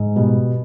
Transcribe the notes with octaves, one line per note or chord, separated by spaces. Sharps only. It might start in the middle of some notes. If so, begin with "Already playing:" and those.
Already playing: G#2
B2 G3